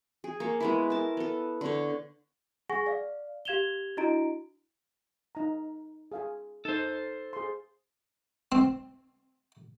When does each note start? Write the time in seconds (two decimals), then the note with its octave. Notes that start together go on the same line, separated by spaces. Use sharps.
0.24 G#4
0.40 A#3 C#5
0.60 G#3 B3 E4
0.90 A#4 A5
1.17 B3 A4
1.61 D3 C#5
2.69 G#4 F#5 G#5 C#6 A#6
2.86 D5 F5
3.45 G4 F5 G#6 E7 F7 G7
3.97 D4 E4 F#4 D#5 A#5 D7
5.35 D#4 A#5
6.12 G#4 F5 G#5
6.65 D#4 A4 C5
7.33 G#4 C6
8.52 C4